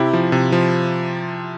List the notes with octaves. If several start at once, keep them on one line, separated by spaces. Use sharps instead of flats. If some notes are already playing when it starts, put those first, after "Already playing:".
Already playing: C3 E4 G4
F3
C3
F3